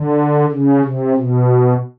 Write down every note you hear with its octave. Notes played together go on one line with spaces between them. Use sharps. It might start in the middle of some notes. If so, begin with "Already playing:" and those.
Already playing: D3
C#3
C3
B2